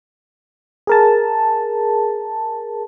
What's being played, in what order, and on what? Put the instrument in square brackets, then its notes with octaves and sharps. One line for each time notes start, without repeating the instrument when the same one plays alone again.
[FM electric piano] G#4 A#4 A5